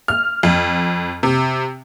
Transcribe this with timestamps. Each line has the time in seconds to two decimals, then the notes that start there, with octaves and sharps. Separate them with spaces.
0.08 F6
0.43 F2
1.23 C3